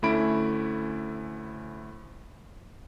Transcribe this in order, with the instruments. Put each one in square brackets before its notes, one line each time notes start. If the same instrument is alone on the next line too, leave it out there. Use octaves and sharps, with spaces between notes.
[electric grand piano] D2 A3 C#4 E4 B5 D7